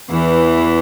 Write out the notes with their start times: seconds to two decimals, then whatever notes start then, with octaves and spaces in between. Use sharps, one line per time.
0.10 E2 E3